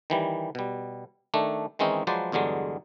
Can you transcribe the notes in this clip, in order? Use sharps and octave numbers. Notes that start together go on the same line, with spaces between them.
D#3 E3 G3
B2 G3
D#3 A3 D4
D#3 E3 G#3 C4 C#4 D#4
F3 F#3 G#3 B4 C5 D5
E2 G2 D3 F#3 G#3